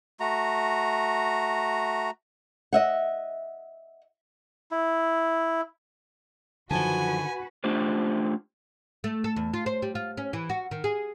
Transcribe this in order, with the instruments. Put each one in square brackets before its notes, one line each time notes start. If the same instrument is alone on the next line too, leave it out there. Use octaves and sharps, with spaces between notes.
[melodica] A3 F#4 A#5
[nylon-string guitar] D#5 E5 F#5
[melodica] E4
[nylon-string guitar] F#2 F3 A5 [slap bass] D3 D#3 [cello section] F#4 B4 [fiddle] G#5
[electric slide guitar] A3 D4 F4 G4 C5
[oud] A3
A4
E2
F4
C5
G3
F4
C#4
E3
F#4
D#3
G#4